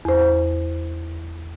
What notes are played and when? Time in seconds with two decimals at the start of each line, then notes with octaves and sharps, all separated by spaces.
0.05 E2 C5